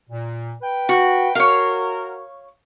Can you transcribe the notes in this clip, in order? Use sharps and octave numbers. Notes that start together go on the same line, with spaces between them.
A#2
B4 G5
F#4
F#4 A#4 C#5 F5